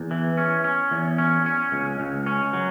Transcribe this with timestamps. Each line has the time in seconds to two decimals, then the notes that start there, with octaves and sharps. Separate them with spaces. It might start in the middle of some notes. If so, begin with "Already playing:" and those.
Already playing: E2
0.11 E3
0.38 C#4
0.64 C#4
0.91 E2
1.18 C#4
1.46 C#4
1.72 C#2
2.00 C#2
2.26 C#4
2.53 F#3